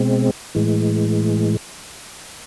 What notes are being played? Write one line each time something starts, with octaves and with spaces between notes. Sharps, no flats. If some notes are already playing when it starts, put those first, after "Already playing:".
Already playing: B2 G#3 C4
A2 E3 G#3